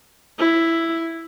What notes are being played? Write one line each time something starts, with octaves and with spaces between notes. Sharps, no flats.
E4